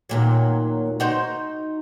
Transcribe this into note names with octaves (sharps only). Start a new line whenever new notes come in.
D#2 A#2 F#3
D#4 F#4 C5